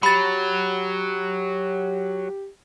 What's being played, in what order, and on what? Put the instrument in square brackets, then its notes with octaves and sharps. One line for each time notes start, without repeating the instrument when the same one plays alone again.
[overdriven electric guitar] F#3 [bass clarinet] G4 [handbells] B5 A6